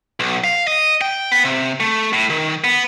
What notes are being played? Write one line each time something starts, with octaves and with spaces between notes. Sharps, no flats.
B1
F5
D#5
G5
B3
C3
A3
A2
D#3
B3